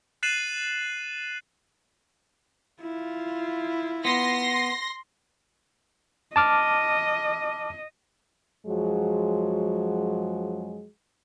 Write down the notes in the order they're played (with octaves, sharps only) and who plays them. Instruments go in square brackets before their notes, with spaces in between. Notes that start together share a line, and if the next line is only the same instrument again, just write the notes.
[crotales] F#6 A6 C7 D#7 E7 F#7
[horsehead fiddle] E4 F4
[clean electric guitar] B3 [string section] C6 A#6
[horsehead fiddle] D#5 [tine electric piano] A5 D6 F6
[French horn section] F#2 F3 F#3 G#3 F#4 G#4